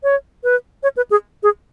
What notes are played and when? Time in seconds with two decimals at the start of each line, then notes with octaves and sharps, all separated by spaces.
0.03 C#5
0.44 B4
0.83 C#5
0.97 B4
1.11 G#4
1.43 G#4